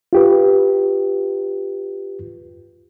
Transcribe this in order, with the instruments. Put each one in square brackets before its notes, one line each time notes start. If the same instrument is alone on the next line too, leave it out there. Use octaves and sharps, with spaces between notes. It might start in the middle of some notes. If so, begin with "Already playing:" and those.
[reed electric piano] F4 G4 B4